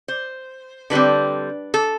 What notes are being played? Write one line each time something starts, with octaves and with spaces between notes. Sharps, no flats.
C5
D3 G3 C4 B4
A4